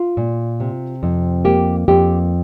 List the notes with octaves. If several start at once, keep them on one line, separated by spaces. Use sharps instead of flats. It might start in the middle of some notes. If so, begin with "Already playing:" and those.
Already playing: F4
A#2
C3
F2
A#3 G4
F2 G4